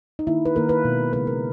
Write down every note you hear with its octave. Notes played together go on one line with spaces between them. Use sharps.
D#4
D#3 A#3 E4
B4
D#3 A#3 A#4
B4
B2 G#3
C#3 G#3 B4
A#4